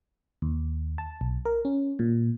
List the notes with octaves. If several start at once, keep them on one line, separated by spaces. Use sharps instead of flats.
D#2
A5
B1
A#4
C#4
A#2